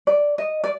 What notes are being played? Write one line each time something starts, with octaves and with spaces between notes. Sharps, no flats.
D5
D#5
D5